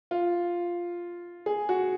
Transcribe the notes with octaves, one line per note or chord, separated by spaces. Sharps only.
F4
G#4
F#4